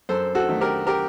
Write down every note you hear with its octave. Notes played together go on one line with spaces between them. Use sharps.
F#2 A4 C5
F#4 A4
D#3 F#3 A3
G4 A#4
G4 A#4